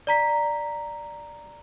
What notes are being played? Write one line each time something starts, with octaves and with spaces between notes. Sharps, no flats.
D5 A#5 B6